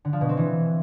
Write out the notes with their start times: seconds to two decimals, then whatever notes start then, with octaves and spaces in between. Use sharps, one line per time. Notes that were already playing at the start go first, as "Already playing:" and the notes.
0.05 D3
0.13 F3
0.21 B2
0.29 C4
0.37 E3